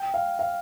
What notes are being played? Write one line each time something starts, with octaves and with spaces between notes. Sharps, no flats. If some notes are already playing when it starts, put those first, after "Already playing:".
Already playing: G5
F5
F5